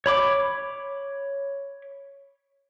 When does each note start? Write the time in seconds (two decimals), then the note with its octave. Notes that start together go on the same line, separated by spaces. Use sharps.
0.06 C#5 B5 D6